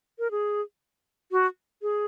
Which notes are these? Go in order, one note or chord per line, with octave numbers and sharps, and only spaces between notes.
A#4
G#4
F#4
G#4